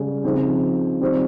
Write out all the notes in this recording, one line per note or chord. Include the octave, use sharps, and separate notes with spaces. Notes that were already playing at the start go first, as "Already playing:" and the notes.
Already playing: C#3 G3 C#4
C#3 F3 C4 D#4
D#3 G3 C4 G4 C5